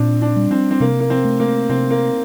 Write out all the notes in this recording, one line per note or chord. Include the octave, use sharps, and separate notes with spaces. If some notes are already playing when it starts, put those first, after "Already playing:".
Already playing: A#2 C4 D4
D4
G3
C4
C4
C3 A#3
A#3
C4
A3
A#3
C3 C4
A#3